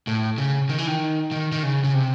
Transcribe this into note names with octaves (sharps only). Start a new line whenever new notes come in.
A2
C#3
D#3
E3
D#3
D#3
D#3
C#3
C#3
C3